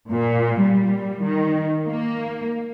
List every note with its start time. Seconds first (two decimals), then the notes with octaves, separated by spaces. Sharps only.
0.12 A#2
0.60 G3
1.25 D#3
1.87 A#3